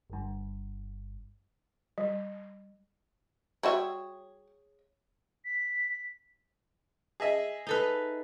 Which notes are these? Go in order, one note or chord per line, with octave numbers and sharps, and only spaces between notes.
G1 G2
G3
G3 F#4 G#4 C#5 E5
B6
G#4 D#5 E5
D#4 A4 B4